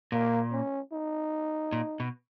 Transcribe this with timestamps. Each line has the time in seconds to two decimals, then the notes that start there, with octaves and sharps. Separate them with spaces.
0.12 A#2 A#3
0.52 C#4
0.92 D#4
1.72 A#2
2.00 B2